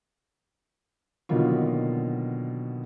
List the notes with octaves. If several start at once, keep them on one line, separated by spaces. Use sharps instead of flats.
B2 D3 D#3 F#3 A#3 F4